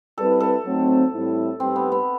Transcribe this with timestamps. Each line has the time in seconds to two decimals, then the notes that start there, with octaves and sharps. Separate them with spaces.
0.17 G3 C4 E4 A4 B4
0.40 A4
0.65 F#3 A3 C4 D#4
1.12 A2 G3 C4 E4
1.60 A2 G3 C4 D#4 G4 B4
1.76 B3
1.92 B3